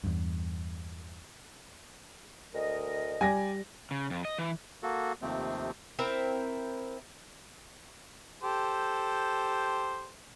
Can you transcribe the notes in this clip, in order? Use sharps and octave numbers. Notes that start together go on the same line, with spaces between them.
E2 G2
D2 A#4 D#5
G3 D5 G5 G#5 A#6
C#3
F2
D#5
E3
A#3 F#4 A4
D#2 C3 F3 A3 C4
C4 E4 A#4
G4 A4 C5